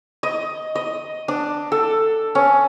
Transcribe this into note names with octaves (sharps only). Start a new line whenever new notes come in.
D#5
D#5
D4
A4
C#4